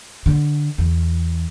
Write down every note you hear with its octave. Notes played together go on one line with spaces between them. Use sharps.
D3
E2